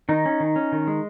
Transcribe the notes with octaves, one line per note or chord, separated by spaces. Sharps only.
D#3 D#4
C#4
D#3
C#4
D#3
G#3